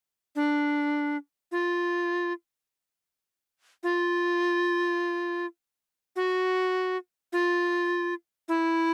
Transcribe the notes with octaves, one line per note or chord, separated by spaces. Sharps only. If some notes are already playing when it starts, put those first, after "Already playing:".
D4
F4
F4
F#4
F4
E4